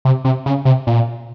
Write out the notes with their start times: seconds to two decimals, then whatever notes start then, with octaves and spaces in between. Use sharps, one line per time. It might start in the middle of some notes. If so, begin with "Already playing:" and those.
0.05 C3
0.25 C3
0.46 C#3
0.65 C3
0.87 A#2